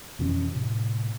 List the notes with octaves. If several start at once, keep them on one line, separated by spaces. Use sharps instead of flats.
F2 B2 E3 C#4
A2 C3